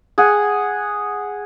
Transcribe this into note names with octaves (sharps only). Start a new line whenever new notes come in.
G#4 F#5